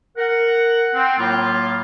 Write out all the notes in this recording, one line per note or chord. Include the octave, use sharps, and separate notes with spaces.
A#4 F#5
C4
A2 F#3 A#3 F4